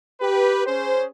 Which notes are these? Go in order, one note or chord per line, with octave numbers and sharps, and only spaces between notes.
G4 B4
C#4 G#4 C5